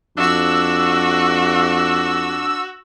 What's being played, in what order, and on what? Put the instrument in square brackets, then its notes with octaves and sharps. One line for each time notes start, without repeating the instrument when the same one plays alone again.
[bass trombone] F2 [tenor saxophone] D4 [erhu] F#4 [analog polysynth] E6